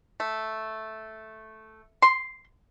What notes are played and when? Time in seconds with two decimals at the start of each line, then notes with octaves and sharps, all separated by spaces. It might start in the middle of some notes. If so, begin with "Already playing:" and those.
0.20 A3
2.02 C6